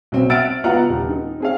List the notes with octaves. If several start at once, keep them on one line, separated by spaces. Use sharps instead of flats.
B1 C4
E5 F#5 E6 F6 A6 D7
B3 F4 F5 F#5 A#5
D#1
D#4
C4 G#4 F5